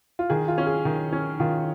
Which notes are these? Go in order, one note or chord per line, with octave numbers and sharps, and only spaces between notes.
F4
D#3 G#4
F4
C#4
G#4
D#3
C#4
D#3 F4